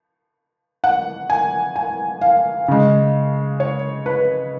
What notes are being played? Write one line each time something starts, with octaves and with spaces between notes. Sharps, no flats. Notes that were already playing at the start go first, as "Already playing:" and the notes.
F#5
G#5
G#5
F5
C#3 G#3
C#5
B4